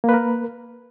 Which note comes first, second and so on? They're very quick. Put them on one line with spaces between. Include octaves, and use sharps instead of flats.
A#3 B4 A#4